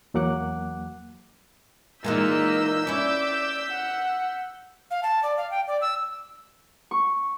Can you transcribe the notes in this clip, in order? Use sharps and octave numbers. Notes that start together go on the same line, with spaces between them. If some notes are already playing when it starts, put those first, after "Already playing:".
E2 F#3 A#3 F#5 D6 F#6
A#2 E3 G#3 A#3 D#4 E6 G6 B6
C#4 E4 D5 D6
F#5
F5
A5
D5
F5
G5
D5
E6
C#6